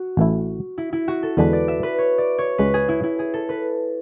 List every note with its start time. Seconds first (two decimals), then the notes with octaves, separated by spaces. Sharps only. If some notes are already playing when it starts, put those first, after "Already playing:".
Already playing: F#4
0.17 A1 A2 E3 A3 E4
0.78 E4
0.93 E4
1.08 F#4
1.23 A4
1.37 E2 D3 G#3 D4 B4
1.53 D5
1.68 E5
1.83 B4
1.98 C#5
2.18 D5
2.38 C#5
2.58 C#2 C#3 G#3 B4
2.74 G#4
2.89 E4
3.03 E4
3.19 G#4
3.34 A4
3.49 B4